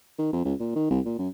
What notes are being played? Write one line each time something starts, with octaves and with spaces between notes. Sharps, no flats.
D#3
F2
C#2
A#2
D#3
C2
A#2
F#2